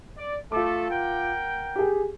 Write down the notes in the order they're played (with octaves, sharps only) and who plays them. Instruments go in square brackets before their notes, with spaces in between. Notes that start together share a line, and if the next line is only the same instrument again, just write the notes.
[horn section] D5
[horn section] A3 A4 [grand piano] F4 D6
[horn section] A#4 F#5 G5
[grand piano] G4 G#4